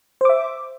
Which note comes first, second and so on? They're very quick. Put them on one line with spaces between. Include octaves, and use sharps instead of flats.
C5 D6 E5